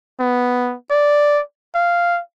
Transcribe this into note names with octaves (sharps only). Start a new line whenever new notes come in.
B3
D5
F5